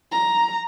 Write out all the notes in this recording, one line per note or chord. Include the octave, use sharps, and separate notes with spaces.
A#5